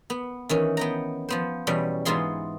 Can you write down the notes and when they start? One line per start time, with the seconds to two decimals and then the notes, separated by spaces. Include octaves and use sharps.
0.10 B3
0.49 D#3 E3 C#4
0.77 B3 G5 A#5
1.29 F3 B3 C5
1.67 E2 B2 G3 C#4
2.05 G#2 E3 B3 F4 G#4 C6